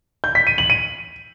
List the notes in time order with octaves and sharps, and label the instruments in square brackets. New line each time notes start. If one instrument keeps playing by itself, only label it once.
[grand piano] G6
B6
D#7
F#7
D#7